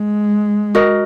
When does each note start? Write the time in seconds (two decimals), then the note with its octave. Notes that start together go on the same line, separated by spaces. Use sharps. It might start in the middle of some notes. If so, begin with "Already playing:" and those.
Already playing: G#3
0.75 F#4 A#4 D#5